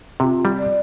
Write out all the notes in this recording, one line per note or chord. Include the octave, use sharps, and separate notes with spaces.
C3 F4 G4
G3
D5